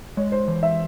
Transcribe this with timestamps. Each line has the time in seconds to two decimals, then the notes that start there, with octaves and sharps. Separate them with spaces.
0.17 G#3 C#5
0.32 C5
0.48 E3
0.63 E5